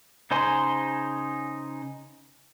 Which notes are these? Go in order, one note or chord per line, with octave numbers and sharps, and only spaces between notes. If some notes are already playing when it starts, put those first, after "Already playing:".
C#3 D#4 C5 G#5 C6